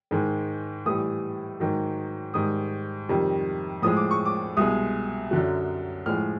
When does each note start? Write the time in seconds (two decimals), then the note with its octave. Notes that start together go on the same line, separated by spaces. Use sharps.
0.11 G#2 D#3 G#3
0.86 A2 E3 G3 D#6
1.60 G#2 D#3 F#3
2.34 G#2 D#3 G3 D#6
3.09 F2 C3 D#3 G3
3.82 A2 F3 G#3 D#6
3.97 D6
4.11 C#6
4.26 D6
4.57 C2 B2 G#3 D#6
5.31 F#2 D3 F#3
6.06 A2 F3 G#3 F6